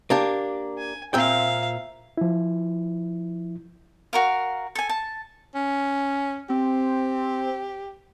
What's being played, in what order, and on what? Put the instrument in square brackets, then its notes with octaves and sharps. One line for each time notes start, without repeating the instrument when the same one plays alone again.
[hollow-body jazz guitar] A#3 D4 G4
[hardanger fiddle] G#5
[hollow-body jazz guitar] A#2 C4 G5 [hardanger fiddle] E5 F5
[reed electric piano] F3 E4
[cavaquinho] F#4 A#4 F5
A4 G#5
A5
[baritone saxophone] C#4
[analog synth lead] C4 [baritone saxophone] G4